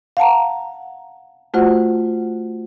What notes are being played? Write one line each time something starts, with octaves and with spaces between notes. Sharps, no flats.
F5 F#5 A5 A#5
A3 F4 F#4 C5 F#5